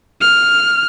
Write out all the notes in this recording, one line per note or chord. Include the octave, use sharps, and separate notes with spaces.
F6